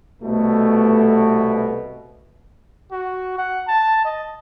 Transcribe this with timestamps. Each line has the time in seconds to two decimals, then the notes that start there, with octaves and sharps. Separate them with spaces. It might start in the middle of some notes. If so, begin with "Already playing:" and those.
0.22 C2 B2 A3
2.92 F#4
3.38 F#5
3.68 A5
4.05 D#5